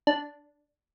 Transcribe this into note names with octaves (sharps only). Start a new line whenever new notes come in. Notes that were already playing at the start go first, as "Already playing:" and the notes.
D4